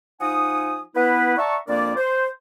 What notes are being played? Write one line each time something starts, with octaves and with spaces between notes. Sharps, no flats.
F3 D#4 F#5 G#5 D#6
B3 E4 B4
D5 E5 F#5 A5 A#5 C#6
F2 A#3 D4 A#4 D5
C5